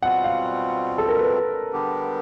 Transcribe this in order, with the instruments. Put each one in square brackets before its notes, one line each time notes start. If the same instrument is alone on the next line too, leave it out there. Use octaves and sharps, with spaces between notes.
[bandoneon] B2 G3 C4 F4 [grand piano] F#5
[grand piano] F5
A4
A#4
B4
[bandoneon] D3 G3 B3 D4 G4